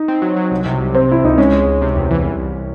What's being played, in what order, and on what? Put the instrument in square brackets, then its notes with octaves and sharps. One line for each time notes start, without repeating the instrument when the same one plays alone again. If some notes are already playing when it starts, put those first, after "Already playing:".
Already playing: [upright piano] D#4
[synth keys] C4
F#3
F#3
C2
C3
C2
[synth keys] C3 [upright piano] C4
[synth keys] C3 [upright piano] E4
[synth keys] C#2 [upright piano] D#4
[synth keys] G#3 [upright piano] C#4
[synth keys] G#3
C#2
C3
E2
E3
C2
C2